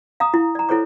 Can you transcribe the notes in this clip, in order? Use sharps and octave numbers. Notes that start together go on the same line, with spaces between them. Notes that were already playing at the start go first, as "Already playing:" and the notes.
F5 A#5 D#6
E4
D5 A#5
E4 A4 C5 C#5 D6